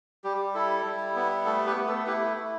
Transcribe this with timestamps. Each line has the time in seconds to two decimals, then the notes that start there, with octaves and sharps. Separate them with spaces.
0.24 G3 G4
0.55 E4 A4
0.85 G3
1.16 B3
1.46 A3 A4
1.66 G4 B4
1.77 A3
1.87 A4
2.06 E4 G4 B4
2.37 E4